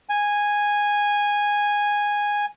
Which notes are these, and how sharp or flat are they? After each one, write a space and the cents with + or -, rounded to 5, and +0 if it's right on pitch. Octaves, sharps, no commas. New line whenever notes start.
G#5 -10